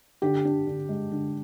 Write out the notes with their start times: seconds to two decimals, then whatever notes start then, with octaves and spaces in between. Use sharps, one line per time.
0.22 D3 G4
0.45 D4
0.67 D3
0.89 G#3
1.12 D3